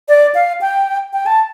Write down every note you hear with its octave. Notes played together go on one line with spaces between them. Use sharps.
D5
F5
G5
G5
A5